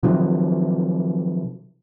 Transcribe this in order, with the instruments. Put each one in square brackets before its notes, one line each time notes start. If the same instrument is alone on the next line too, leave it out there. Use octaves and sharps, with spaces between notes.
[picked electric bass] C3 D#3 F3 F#3